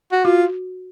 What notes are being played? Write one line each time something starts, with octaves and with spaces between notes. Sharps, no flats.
F#4
F4 F#4